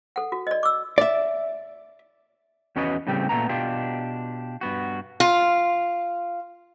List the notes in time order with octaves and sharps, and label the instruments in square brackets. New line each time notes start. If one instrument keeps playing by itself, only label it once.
[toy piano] A4 F#5
F#4
D5 D#5
D6 E6
[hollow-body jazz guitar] D5 E5
[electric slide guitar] E2 C#4 F#4 B4 D#5
A2 C#3 G3 C4 G4
A#2 A3 B3 A#5
B2 D4 F4 G4
G2 B3 F#4
[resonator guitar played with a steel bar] F4